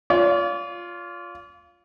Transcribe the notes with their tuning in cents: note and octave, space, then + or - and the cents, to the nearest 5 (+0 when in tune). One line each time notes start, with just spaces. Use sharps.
F4 +0 D5 -45